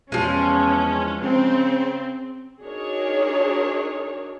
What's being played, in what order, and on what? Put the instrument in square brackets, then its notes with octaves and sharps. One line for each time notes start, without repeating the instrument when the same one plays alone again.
[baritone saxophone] E2 [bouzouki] F3 G#3 [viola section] C#4
[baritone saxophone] C#3 [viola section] C4
[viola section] D4 D#4 F#4 G#4 A#4 C#5